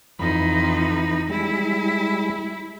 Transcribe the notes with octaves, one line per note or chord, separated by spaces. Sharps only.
F2 E3 D#4 B5
G3 G#3 E4